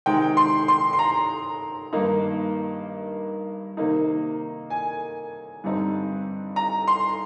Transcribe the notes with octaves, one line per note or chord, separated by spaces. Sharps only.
C3 D#3 G#3 G5
C6
C6
C6
A#5
G2 D#3 A#3 D#4
C3 D#3 A#3 D#4
G#5
G2 D3 G3 C4 D#4
A#5
C6